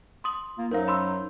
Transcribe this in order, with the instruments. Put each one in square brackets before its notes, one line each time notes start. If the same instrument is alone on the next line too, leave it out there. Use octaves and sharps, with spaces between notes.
[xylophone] C6 D#6 F#7
[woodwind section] A#3 F4
[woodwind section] F#2 F#3 D#4 [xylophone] A#4 C5 F5
[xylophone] B5 C6 E6